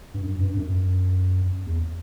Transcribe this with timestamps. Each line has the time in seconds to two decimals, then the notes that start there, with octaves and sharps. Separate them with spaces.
0.14 G2
0.23 F#2
0.40 G2
0.57 F#2
1.66 E2